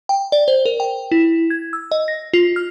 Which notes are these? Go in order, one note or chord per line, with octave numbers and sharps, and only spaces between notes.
G5
D5
C5
A#4
G5
E4
G#6
E6
D#5
A#6
F4
F6